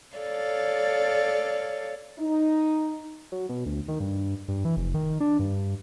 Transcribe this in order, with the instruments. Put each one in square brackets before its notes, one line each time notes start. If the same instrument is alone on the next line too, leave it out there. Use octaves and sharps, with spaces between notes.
[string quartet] A4 C#5 D5 F5
[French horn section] D#4
[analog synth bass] F#3
B2
D2
D#3
G2
G2
E3
F1
D#3
D4
G2